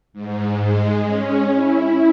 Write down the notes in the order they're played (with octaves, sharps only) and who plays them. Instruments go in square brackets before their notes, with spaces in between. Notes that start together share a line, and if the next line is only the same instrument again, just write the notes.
[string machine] G#2
G#3
C#4
E4